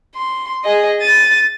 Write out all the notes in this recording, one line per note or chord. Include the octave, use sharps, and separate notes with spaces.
C6
G#4 D#5
A6 D#7